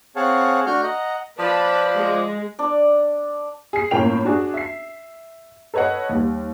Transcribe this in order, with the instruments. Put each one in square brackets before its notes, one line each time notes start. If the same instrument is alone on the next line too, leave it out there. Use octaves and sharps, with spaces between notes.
[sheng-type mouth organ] C4 G#4 C#5 F5 F#5 A5
A3 D4 F#4 C#6 F6 G6
D#5 F#5 A#5
[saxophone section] F3 D5 [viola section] B4 A5 B5
[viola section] G#3
[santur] D4 D5
[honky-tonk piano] G#4 C7
G1 A2 A#3 C#4 G5 F7
D4 F#4 G#4
E5 C7
A4 B4 C#5 D#5 F#5
D#2 G3